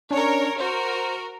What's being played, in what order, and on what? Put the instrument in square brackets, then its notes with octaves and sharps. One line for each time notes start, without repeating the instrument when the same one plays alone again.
[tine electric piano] C#4 D4 [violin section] A#4 C#5
[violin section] F#4 A#4 [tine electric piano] C5